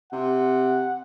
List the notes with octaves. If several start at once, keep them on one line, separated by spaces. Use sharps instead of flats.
C3 F#5